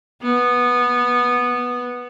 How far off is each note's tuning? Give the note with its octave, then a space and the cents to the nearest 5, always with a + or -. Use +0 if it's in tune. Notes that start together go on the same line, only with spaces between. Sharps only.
B3 -10